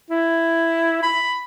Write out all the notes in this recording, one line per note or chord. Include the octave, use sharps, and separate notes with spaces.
E4
B5